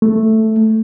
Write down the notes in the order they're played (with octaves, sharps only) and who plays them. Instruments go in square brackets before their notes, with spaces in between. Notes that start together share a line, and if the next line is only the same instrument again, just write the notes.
[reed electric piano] A3